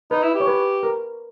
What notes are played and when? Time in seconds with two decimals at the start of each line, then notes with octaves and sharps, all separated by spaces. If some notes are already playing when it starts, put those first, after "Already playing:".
0.11 D#4 B4
0.23 E4
0.35 G4
0.40 C#5
0.47 B4
0.83 A#4